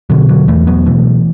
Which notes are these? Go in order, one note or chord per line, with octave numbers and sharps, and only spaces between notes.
B2 D3 F#3
D3 F#3
E2 E3 A3
F#3 B3
B2 E3 A3